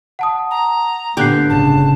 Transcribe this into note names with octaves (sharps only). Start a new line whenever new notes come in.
F#5 A5 D#6
A#5
A#2 D3 B3 D4 G4 F#6 C7
G1 A2 C#3 A5